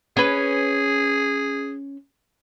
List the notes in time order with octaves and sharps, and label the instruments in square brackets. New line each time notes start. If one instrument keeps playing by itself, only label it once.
[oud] C#4 B4 [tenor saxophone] G#4